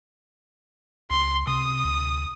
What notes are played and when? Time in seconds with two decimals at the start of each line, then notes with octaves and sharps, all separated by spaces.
1.11 C#2 C6
1.47 C3 D#6
1.85 D2